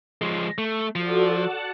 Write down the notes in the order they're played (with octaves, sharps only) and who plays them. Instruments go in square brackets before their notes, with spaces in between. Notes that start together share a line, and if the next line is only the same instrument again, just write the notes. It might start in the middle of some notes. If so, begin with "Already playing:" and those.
[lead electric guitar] F3 G#3
A3
[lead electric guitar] F3 [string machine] F#4 A4 D5
[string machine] F#5 A5